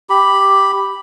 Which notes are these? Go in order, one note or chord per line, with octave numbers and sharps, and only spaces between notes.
G4 B5